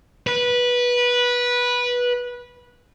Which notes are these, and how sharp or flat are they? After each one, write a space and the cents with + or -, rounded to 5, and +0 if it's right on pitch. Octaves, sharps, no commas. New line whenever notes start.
B4 -15